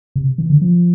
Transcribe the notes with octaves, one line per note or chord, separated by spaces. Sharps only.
C3
E3
D3
F3